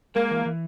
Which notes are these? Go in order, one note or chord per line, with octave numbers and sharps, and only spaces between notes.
G#3 A#3
E3
E3